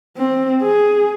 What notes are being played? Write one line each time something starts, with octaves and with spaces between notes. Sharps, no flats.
C4
G#4